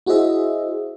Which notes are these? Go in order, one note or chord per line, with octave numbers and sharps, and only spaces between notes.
E4 F#4 G#4 C5 D#5 E5